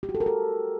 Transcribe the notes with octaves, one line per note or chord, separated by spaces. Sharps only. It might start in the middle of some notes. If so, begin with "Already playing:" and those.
G4
F#4
A4
A#4
A4